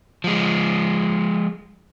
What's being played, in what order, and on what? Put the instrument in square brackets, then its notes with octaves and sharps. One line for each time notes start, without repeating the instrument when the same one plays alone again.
[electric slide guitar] F3 G#3